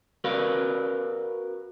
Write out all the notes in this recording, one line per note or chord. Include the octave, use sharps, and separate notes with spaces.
F#4 A#4 B4 D5 F5